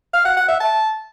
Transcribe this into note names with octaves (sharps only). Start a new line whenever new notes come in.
F5
F#5
F#5
E5
A5